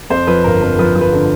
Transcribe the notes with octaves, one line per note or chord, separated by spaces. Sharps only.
F2 C5
F3 B4
G1 A#4
F2 A#4
F3 B4
F3
B4
D3